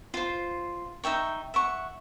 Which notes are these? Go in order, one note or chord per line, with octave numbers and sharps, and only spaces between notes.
F4 C5
D#4 E5 G5 C#6
E5 F#5 C#6